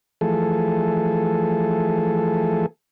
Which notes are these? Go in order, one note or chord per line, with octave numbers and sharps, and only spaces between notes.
E3 F3 A3 G#4 A4